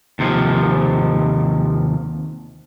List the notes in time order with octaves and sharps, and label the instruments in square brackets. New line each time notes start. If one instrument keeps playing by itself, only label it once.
[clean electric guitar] D#2 C3 D#3 F3